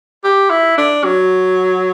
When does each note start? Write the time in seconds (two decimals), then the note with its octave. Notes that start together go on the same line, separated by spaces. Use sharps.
0.24 G4
0.50 E4
0.78 D4
1.04 F#3